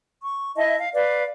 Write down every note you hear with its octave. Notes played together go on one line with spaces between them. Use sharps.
C#6
E4 D#5 E5 A5
F5
B4 D5 F5